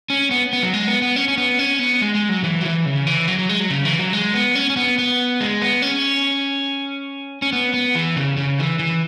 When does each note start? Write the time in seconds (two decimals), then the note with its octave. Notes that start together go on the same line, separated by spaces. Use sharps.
0.10 C#4
0.31 B3
0.53 B3
0.63 F#3
0.74 G#3
0.88 B3
1.02 B3
1.16 C#4
1.28 C#4
1.37 B3
1.59 C#4
1.79 B3
2.01 G#3
2.15 G#3
2.29 F#3
2.44 E3
2.61 F#3
2.65 E3
2.86 C#3
3.07 E3
3.28 F#3
3.39 F#3
3.49 G#3
3.60 F#3
3.70 C#3
3.85 E3
3.99 F#3
4.13 G#3
4.34 B3
4.55 C#4
4.70 C#4
4.77 B3
4.98 B3
5.40 G#3
5.62 B3
5.82 C#4
7.42 C#4
7.53 B3
7.74 B3
7.96 E3
8.16 C#3
8.37 C#3
8.59 E3
8.79 E3